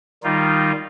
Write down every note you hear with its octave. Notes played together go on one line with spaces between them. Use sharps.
D#3 G3 D#4 F4